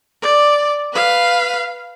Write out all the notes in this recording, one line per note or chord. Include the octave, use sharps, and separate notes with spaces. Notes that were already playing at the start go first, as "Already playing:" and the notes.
D5
B4 F5